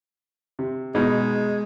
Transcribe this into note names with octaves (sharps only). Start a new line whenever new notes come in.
C3
B2 G#3 D#4 G#4